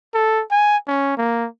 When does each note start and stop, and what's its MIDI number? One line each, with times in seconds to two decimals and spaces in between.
0.14 0.43 69
0.51 0.77 80
0.88 1.14 61
1.17 1.47 58